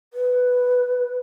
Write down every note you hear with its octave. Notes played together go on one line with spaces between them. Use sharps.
B4